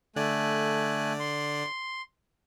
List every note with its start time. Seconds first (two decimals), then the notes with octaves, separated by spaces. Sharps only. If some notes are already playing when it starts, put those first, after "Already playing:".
0.16 D3 A3 D5 G#5 F#6
1.20 C6